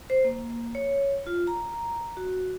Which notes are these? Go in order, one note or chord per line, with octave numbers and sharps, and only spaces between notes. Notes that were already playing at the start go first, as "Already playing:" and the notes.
C5
A#3
C#5
F4
A#5
F#4